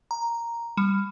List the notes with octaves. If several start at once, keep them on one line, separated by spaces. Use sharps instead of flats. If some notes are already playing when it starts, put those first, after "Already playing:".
A#5
G3